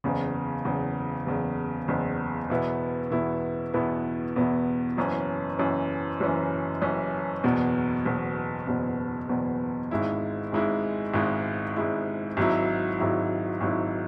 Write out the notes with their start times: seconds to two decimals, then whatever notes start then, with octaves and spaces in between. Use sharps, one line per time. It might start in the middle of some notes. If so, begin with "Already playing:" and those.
0.04 F#1 E2 C#3
0.65 F#1 E2 C#3
1.26 F#1 E2 C#3
1.88 F#1 E2 C#3
2.50 E2 B2 B3 E4
3.11 E2 B2 B3 E4
3.74 E2 B2 B3 E4
4.36 E2 B2 B3 E4
4.97 F#1 F#2 E3 C#4
5.59 F#1 F#2 E3 C#4
6.20 F#1 F#2 E3 C#4
6.82 F#1 F#2 E3 C#4
7.44 F#1 E2 B2
8.05 F#1 E2 B2
8.67 F#1 E2 B2
9.29 F#1 E2 B2
9.91 G#1 G#2 G#3 E4
10.52 G#1 G#2 G#3 E4
11.14 G#1 G#2 G#3 E4
11.76 G#1 G#2 G#3 E4
12.37 G#1 G#2 F#3 E4
12.99 G#1 G#2 F#3 E4
13.61 G#1 G#2 F#3 E4